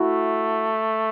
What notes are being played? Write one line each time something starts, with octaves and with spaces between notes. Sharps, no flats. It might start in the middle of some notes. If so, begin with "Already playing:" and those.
Already playing: A3 E4 F#4